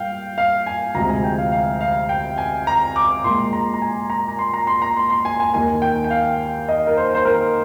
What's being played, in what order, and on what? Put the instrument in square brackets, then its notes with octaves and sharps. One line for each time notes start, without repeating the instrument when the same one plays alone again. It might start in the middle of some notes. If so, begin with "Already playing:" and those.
Already playing: [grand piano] A#2 G3 F5 G5
F5
G#5
D2 C3 F3 G#3 A#5
G#5
G5
F5
F5
F5
G5
G#5
A#5
D6
A#2 G#3 C6
A#5
A#5
G#5
A#5
A#5
C6
A#5
C6
A#5
C6
C6
G#5
G#5
D#2 D#3 A#3 G#5
G5
G5
F5
D#5
A#4
C5
C5
A#4